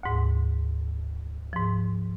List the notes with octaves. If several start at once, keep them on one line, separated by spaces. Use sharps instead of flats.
D2 G#2
G#2 F3